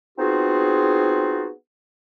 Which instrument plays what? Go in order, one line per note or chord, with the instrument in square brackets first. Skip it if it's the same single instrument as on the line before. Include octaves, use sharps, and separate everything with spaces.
[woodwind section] B3 C4 D#4 F4 F#4 G#4